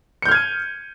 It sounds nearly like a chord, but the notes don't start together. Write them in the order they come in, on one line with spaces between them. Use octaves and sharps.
C#7 G6 F6 G#6 D#7